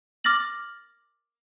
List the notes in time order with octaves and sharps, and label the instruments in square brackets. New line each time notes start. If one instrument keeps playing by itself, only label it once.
[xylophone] D6 F6 A6 A#6 F#7